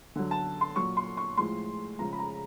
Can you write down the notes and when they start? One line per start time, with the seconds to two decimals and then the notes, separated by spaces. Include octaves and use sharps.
0.15 D3 F#3
0.31 A5
0.61 C6
0.76 A#2 F#3 C#6
0.97 C6
1.17 C#6
1.37 A2 F3 G#3 C6
1.98 C#3 F3 G#3 A#5
2.12 B5
2.19 A#5